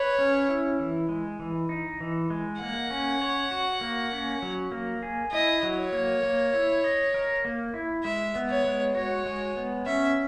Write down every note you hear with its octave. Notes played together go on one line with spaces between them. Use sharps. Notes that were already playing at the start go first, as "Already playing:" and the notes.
Already playing: B4 C#5
C#4
E4
E3
G#3
E3
D#4
E3
G#3
A#3 F#5
C#4
C#5
F#4
A#3
C#4
F#3
A#3
G#4
E4 D#5
F#3
C#5
A#3
A#3
E4
D#5
A#4
A#3
E4
G#3 E5
B3
C#5
G#3
F#4 C#5
G#3
B3
C#4 E5